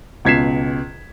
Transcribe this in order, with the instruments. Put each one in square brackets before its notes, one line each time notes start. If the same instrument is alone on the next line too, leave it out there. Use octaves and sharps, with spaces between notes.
[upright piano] C#2 B2 G#6 B6 C7 E7